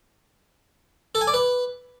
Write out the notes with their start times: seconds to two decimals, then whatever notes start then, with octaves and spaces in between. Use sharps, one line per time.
1.15 A4
1.21 G#5
1.27 D5
1.34 B4